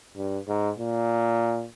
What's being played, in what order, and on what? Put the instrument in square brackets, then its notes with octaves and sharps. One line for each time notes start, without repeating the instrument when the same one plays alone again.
[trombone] G2
G#2
A#2